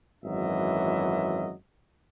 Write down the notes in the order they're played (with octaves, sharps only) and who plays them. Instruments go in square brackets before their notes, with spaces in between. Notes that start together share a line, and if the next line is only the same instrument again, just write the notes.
[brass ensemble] G#1 F#2 E3 F#3 D#5 E5